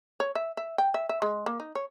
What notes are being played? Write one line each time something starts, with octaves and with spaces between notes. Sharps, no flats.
C#5
E5
E5
G5
E5
E5
G#3
A#3
D#4
C#5